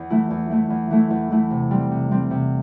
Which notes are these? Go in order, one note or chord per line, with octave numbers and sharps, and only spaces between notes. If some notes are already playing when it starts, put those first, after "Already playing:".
Already playing: E2
E3 A3 E4
E2
E3 A3 E4
E2
E3 A3 E4
E2
E3 A3 E4
C3
G3 C4
C3
G3 C4
C3